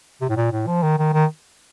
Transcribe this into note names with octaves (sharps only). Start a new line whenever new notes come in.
C3
A2
A#2
A2
F3
D#3
D#3
D#3